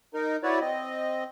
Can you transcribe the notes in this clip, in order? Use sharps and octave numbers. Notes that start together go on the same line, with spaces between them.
D#4 A#4
E4 F#4 B4 C#5 D5
C4 D#5